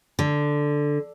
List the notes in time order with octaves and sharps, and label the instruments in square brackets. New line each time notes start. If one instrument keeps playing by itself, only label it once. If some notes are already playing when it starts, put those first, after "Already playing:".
[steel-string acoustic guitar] D3